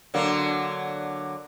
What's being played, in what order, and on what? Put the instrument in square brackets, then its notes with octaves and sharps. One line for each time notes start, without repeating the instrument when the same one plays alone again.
[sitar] D3 F#3 A#3